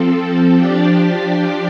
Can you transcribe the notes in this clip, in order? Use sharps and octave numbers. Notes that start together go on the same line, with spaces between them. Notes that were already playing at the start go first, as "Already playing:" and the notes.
Already playing: F3 C4 A4
F3 D4 G4 D5